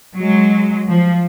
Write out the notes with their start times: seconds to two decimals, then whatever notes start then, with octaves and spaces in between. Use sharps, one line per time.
0.15 F#3 G#3
0.89 F3